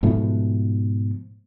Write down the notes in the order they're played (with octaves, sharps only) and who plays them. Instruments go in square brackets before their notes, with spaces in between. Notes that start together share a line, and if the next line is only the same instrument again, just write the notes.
[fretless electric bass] G#2 B2 F3 A3